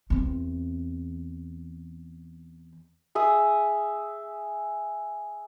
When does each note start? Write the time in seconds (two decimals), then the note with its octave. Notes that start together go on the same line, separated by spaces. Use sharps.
0.10 E2 C4
3.15 G#4 E5 D#6